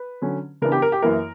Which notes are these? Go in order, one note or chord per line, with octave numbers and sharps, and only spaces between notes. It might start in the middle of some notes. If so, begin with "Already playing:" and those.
Already playing: B4
D3 F#3 C#4
C#3 E3 B3 D4 A#4
G4
A#4
G4
F#2 E3 A#3 E4 A#4